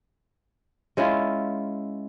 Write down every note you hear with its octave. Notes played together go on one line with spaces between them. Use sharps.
G#3 C#4 E4 F4